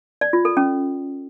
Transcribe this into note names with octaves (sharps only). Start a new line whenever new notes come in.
D5
F4
A4
C#4